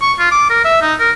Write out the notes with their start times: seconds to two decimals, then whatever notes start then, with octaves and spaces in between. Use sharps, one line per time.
0.02 C#6
0.19 F4
0.31 D6
0.50 A#4
0.65 E5
0.82 D#4
0.99 A#4